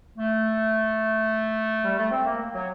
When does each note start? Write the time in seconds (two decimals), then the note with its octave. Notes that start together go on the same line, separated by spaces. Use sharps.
0.18 A3
1.84 G3
1.98 A3
2.11 C4
2.26 A#3
2.53 F#3